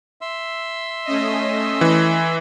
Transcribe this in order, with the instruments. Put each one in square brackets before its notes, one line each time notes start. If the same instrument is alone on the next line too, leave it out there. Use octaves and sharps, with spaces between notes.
[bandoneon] E5 C6 E6
[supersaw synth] A3 C#4 D#5
[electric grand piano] E3